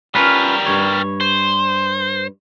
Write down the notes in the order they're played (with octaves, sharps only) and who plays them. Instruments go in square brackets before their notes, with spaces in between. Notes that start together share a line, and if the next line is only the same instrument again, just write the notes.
[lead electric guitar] G3 A#4 [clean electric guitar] C#4 F4 B4
[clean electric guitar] G2 C#5
[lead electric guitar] C5